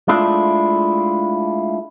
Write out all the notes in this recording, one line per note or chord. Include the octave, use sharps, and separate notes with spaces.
G#3 A3 D4 E4 F4